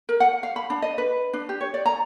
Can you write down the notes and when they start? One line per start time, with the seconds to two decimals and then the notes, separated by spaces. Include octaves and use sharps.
0.09 A#4
0.20 F#5
0.43 F5
0.56 B5
0.70 D4
0.82 D#5
0.98 B4
1.33 D4
1.49 G4
1.61 C#5
1.74 D5
1.86 A#5